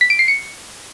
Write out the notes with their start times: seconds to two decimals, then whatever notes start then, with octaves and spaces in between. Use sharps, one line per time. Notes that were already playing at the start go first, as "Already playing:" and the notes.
0.01 B6
0.10 D7
0.19 C7
0.28 C#7